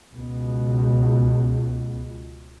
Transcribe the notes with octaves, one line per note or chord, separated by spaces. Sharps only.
C#2 B2